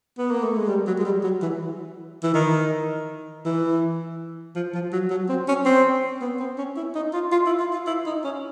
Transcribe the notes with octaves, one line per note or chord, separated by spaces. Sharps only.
B3
A#3
A3
G#3
G3
F#3
G#3
G3
F#3
E3
E3
D#3
E3
F3
F3
F#3
F#3
C4
C#4
C4
B3
C4
C#4
E4
D#4
F4
F4
E4
F4
F4
E4
D#4
C#4